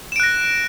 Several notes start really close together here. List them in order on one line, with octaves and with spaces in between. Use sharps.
E7 D7 F#6 A#6